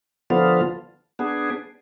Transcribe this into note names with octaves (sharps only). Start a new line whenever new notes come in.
D3 F3 B3 F4
B3 D4 G#4